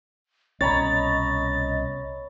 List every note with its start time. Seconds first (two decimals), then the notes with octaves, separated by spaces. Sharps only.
0.61 C2 B2 C#4 C#5 D#5 A#5 B5 A6